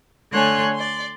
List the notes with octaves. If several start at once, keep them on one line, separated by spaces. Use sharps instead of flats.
D3 A3 C#5 G#5 C6 F#6
D5 C6